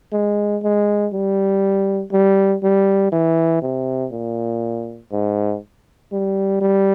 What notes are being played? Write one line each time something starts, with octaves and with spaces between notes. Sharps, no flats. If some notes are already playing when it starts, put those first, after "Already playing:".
G#3
G#3
G3
G3
G3
E3
C3
A#2
G#2
G3
G3